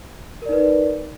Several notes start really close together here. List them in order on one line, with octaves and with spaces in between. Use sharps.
A#4 D5 D#4 B4